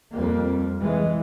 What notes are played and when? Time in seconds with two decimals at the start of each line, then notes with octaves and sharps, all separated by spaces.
0.11 F2 G3 A#3
0.82 E3 G#3